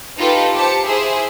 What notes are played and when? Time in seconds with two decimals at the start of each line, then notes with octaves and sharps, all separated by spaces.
0.18 D#4 F4 G4 A4 B4
0.54 G4 C5 A5 C#7
0.85 E4 G#4 C5 E5 C6